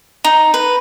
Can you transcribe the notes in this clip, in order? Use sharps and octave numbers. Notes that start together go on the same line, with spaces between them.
D#4
B4